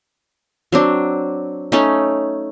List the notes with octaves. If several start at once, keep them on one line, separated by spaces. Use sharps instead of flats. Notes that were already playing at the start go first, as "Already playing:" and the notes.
F#3 C4 D4
A3 C#4 D#4